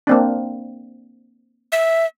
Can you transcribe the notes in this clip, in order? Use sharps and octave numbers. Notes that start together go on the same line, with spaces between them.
A#3 C4 D4
E5